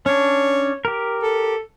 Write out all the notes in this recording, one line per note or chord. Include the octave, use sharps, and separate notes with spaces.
C#4 D4 C#5
G4 A#4
A4